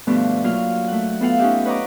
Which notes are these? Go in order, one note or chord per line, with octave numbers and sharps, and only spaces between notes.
G2 B2 F3 A3 B3 D4
F#3 A#3 F4 F5 F6
A3 F#5
B3 F4 A4 F5 F#5
C#4 D#4 F4 G4 E5
B4 C#5 D#5 F#5 A#5 D6